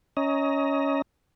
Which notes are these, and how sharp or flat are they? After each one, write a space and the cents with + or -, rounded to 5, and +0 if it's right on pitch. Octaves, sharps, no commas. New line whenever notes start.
C#4 +10 D#5 +25 A#5 +0